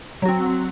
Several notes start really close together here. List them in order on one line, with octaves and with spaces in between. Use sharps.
F#3 F#4 C4